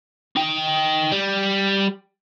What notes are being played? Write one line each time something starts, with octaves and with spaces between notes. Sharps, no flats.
D#4 G5
G3